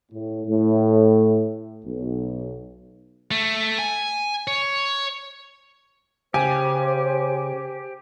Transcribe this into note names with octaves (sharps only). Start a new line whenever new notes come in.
A2
A2
B1
A3
G#5
C#5
C#3 G4 C5 G#5